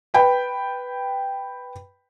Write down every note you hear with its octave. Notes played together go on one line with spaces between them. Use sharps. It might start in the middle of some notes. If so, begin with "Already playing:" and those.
B4 G5 B5